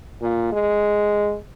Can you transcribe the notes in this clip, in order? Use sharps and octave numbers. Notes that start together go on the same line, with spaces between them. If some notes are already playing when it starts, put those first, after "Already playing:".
A#2
G#3